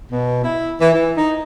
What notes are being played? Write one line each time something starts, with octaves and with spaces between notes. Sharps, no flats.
B2
E4
E3
E3
D#4